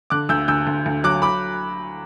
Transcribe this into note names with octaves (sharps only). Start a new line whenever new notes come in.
D3 D6 F#6
D2 E6 G6
D2 E6 G6
D2
D2
F#3 D6 F#6
B5 D6